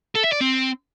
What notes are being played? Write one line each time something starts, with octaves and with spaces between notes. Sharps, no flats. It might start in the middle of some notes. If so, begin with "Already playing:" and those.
A4
E5
D5
C4